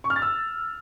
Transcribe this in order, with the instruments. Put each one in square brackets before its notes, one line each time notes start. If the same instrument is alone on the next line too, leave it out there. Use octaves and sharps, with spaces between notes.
[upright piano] C#6
F6
A6
E6